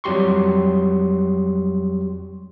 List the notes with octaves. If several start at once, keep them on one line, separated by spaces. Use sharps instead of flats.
F2 F#3 G3 G4 C6 C#6